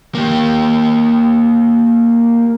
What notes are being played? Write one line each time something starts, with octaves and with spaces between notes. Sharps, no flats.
A#3 G4